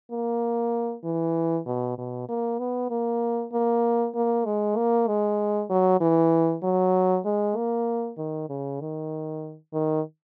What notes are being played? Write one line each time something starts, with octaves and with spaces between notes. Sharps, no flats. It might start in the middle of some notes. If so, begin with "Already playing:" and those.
A#3
E3
B2
B2
A#3
B3
A#3
A#3
A#3
G#3
A#3
G#3
F#3
E3
F#3
G#3
A#3
D#3
C#3
D#3
D#3